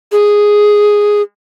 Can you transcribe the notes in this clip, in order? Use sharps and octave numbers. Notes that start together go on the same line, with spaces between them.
G#4